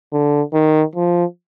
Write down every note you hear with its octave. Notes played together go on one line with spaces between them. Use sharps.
D3
D#3
F3